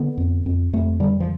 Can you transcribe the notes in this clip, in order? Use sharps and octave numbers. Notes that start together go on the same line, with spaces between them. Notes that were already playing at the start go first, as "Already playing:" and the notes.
Already playing: D3 B3
F2
F2
F2 A3
D3 G3
F3